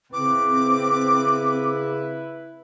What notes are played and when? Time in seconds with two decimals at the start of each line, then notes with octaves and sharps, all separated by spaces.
0.13 C#3 C4 E4 B4 D6